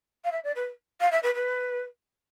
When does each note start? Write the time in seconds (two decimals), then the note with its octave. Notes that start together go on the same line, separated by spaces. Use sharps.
0.24 F5
0.31 E5
0.43 D5
0.55 B4
1.00 F5
1.11 E5
1.23 B4
1.34 B4